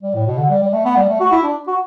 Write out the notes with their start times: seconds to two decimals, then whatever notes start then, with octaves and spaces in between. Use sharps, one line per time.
0.03 G3
0.15 A2
0.27 B2
0.38 D3
0.50 G3
0.62 G3
0.73 A3
0.85 B3
0.97 G3
1.09 A3
1.20 F#4
1.32 E4
1.43 D4
1.67 F#4